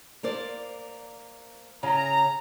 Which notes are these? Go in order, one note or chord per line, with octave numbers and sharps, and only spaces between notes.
A#3 C5 D5
C#3 A#5